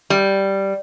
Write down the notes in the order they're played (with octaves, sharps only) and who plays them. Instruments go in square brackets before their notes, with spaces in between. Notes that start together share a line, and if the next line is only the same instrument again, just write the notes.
[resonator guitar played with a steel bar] G3